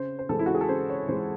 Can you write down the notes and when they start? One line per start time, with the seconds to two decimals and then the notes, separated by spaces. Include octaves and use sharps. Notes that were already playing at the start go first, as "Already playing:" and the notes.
Already playing: C#3 C5
0.19 C5
0.29 E3 G#3 A4
0.39 E4
0.46 F#4
0.55 G#4
0.61 A4
0.69 C#3 C5
0.89 C#5
1.08 E3 G#3 C5